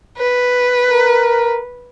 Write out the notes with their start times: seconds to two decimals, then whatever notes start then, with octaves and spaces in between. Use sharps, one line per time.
0.18 B4
0.89 A#4